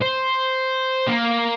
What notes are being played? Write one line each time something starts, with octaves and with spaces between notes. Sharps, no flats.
C5
A#3